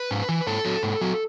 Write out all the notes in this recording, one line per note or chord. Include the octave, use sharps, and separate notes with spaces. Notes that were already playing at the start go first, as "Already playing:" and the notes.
Already playing: B4
G#2
E3
G#2 A4
F#3
G#2
F#3